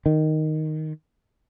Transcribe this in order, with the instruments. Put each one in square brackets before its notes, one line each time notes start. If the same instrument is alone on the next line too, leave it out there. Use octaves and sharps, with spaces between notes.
[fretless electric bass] D#3